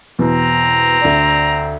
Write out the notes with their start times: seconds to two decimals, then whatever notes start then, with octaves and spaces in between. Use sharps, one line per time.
0.19 E2 B2 C4 A#5
1.01 D2 D5